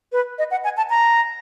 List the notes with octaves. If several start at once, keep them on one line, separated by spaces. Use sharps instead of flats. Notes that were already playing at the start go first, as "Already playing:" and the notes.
B4
D#5
F#5
G#5
A5
A#5